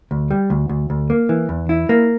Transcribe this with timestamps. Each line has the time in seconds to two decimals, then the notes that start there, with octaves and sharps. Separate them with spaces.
0.11 D2
0.31 G3
0.50 D2
0.69 D2
0.90 D2
1.10 A#3
1.29 E3
1.49 E2
1.69 E4
1.89 A#3